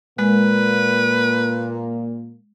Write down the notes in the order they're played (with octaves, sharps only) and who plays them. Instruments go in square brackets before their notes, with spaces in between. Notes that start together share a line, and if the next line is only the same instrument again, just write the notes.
[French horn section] A#2 A#3 [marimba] G#3 [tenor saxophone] B4